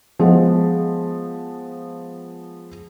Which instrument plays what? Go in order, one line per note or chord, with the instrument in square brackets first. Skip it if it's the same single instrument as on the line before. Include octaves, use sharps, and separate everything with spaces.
[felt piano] F3 G#3 B3